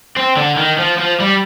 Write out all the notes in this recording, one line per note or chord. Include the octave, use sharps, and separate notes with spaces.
C4
D3
D#3
F3
F3
G3